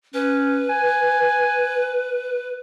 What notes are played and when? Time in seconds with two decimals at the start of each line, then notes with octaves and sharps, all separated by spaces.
0.14 C#4 B4
0.69 G#5